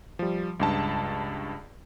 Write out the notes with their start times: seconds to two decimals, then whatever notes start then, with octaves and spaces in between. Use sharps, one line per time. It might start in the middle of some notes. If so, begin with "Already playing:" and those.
0.19 F3 G3
0.60 C#2 G2 A5